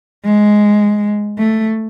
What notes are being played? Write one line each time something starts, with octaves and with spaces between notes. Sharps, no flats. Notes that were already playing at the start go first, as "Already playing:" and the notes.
G#3
A3